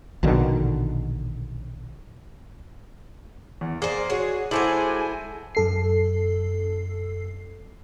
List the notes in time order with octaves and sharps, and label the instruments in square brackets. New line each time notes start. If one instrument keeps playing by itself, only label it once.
[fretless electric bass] A#1 B2 D3 D#3
[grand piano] E2
[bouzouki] A#3 C5 [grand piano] G#4 [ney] D5
[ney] F#4 [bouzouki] G#4 [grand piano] C#5
[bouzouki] G#3 F#4 D5 [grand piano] E4 A4 C5 [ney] G#5
[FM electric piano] F#2 A4 C7